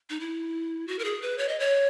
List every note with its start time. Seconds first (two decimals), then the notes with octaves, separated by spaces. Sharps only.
0.10 D#4
0.20 E4
0.88 F#4
0.99 A#4
1.05 G#4
1.22 B4
1.38 C#5
1.48 D#5
1.60 C#5